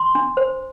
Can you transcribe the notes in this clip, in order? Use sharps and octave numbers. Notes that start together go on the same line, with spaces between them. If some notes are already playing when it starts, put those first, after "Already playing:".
Already playing: C6
D4
C5